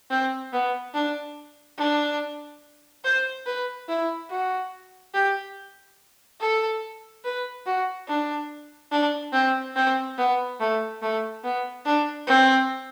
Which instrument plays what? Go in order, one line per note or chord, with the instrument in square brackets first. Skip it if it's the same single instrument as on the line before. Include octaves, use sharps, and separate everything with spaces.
[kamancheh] C4
B3
D4
D4
C5
B4
E4
F#4
G4
A4
B4
F#4
D4
D4
C4
C4
B3
A3
A3
B3
D4
C4